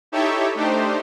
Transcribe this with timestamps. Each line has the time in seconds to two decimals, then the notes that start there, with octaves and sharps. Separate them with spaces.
0.12 D#4 E4 G4 A4 C#5 E5
0.55 A3 D4 D#4 G4 C5